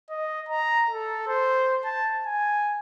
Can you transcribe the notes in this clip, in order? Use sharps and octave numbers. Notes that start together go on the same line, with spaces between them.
D#5
A#5
A4
C5
A5
G#5